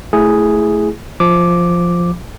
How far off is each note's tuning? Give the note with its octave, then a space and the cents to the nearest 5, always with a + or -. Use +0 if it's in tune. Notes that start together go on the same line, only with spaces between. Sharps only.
A3 +0 E4 +0 G#4 +0
F3 +0 D6 +0